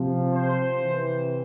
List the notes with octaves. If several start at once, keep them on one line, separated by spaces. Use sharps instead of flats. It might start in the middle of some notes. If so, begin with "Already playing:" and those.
Already playing: C3 F3
C5
C3 E3